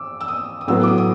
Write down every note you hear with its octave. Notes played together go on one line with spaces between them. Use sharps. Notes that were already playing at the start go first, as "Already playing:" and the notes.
Already playing: D6 E6
E6
D#6
D#6
A2 F#3 B3 E6
D6
D#6
D#6